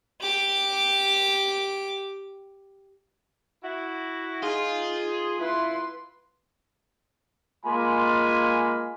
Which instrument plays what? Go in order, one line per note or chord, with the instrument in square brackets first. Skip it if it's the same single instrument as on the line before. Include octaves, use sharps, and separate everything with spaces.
[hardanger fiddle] G4 D6
[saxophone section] E4 F#4
[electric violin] D#4 [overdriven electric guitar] F4 [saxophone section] G#4
[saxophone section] E4 [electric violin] B4 C6
[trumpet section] G#3 A#3 F4 G#5 B5